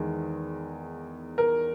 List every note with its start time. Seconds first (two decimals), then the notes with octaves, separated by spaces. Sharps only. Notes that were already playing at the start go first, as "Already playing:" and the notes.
Already playing: E2 D#3 G#3
1.38 A#4